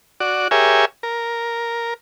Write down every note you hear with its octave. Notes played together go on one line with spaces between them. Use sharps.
F#4 D5
G4 G#4 A#4 C#5 E5 G#5
A#4